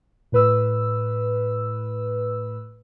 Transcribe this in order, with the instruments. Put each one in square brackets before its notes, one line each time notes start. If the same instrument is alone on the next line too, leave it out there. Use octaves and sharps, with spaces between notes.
[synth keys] A2 B4 E6